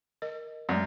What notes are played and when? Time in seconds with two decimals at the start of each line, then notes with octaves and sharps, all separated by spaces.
0.22 A#4 D#5
0.69 F#2 G#3 A3 D5